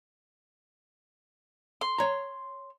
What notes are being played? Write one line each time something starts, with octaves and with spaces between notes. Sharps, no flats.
C6
C#5 A#5